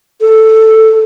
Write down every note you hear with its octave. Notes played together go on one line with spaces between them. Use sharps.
A4